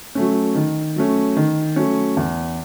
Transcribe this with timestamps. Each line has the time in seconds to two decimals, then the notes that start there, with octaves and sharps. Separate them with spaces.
0.15 F#3 A3 C#4
0.55 D#3
0.96 F#3 A3 C#4
1.36 D#3
1.76 F#3 A3 C#4
2.17 E2